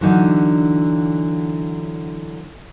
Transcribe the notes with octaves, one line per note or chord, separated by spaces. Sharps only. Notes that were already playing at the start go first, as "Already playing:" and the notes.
D3 E3 F#3 D4 D#4